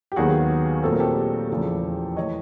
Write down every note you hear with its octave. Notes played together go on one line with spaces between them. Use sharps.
G4
D#2 D#3 F#3 B3 F#4 G#4
A#2 F#3 A3 C4 A4
A#4
G4 A4
E2 C#3 F3 A3
E3 A3 C#5 D#5